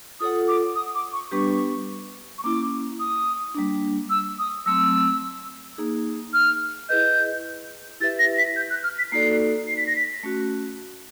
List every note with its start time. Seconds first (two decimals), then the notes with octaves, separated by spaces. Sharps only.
0.20 F4 A4 C#5 F#5 D#6
0.48 D6
0.76 D#6
0.95 D6
1.13 C#6
1.31 G3 B3 D4 G4 B4 C#6
2.38 C#6
2.44 A#3 C#4 E4 D6
3.00 D#6
3.55 G3 A#3 D4
4.10 E6
4.39 D#6
4.66 F#3 A3 C4 E6
5.78 A#3 D#4 G#4
6.33 F6
6.89 E4 G#4 B4 D#5 G6
8.00 E4 G4 B4 E5 A6
8.19 A#6
8.38 B6
8.56 G6
8.70 F#6
8.84 F6
8.98 B6
9.12 A#3 D#4 F#4 A4 D5 C7
9.67 C7
9.77 B6
9.87 A#6
9.96 B6
10.24 A3 C#4 F#4